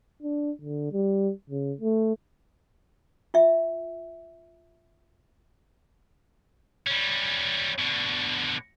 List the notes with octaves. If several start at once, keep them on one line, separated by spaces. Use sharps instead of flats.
D4
D3
G3
C#3
A3
F4 E5
G3 C#4
B2 D3